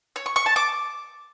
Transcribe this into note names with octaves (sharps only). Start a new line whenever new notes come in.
C#5
C#6
C#6
A5
D6